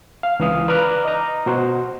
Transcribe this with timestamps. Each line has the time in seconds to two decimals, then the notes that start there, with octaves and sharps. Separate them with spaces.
0.23 F5
0.39 C#2 E3 F5 D#6
0.68 B4 D5 A#5 D6 F6 F#6
1.05 D#5 A#5
1.46 B2 F#4 C5 F#5